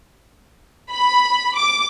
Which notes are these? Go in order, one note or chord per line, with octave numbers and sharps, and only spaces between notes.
B5
D6